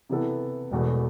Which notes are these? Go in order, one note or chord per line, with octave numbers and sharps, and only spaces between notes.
C3 E3 B3 E4 A4
E1 E2 B2 A3